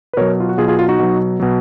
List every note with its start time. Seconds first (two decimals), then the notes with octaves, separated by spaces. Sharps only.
0.13 B4
0.17 B2 F#3 A#4 C#5
0.40 F4
0.49 F#4
0.58 B2 F#3 F4 G#4
0.68 F4 G#4
0.79 F4
0.89 D#4 F#4
0.99 B2 F#3
1.40 B2 F#3